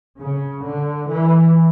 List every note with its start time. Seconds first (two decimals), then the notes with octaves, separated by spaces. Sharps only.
0.20 C#3
0.65 D3
1.10 E3